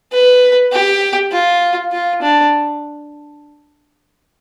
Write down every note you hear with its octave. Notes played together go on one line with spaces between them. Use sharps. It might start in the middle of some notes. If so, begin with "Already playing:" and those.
B4
G4
F4
F4
D4